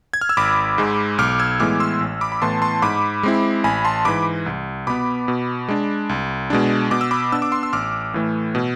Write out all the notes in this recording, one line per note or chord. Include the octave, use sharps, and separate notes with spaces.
G#6
F6
E6
G#1 B5 D6
G#2 G#3
B1 D6 F6
E6 G#6
A2 E3 G#3 B3 D6 F6
C6 E6
A1
B5 D6
B5
A2 E3 B3 A5 C6
A5 C6
G#2 B5 D6
G#3 C4 E4
A1 G#5 B5
A5 C6
G#2 E3 B5 D6
C2
B2 B3 B5 D6
B2
G#3 D4
C2
B2 G#3 D4
B2 D6
E6
B5 D6
B3 D4 E6
D6
C6 E6
E6
A1 D6 F6
A2 E3 A3
B2